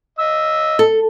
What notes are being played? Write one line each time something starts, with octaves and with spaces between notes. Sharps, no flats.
D#5 E6
A4